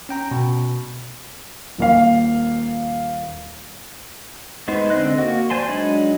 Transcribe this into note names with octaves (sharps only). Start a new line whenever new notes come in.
C#4 G5 A#5
B2
D#1 A#3 F5
G#3 B3 D#4 C5
D3 C4 D4 D#5 F#6
A#3 F#4
C5 D5 G#5 A5 C6
F#3 G#3 D4 D#4 B5